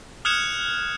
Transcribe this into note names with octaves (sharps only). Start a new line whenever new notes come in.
D#6 F6 F#6 G#6 C#7 E7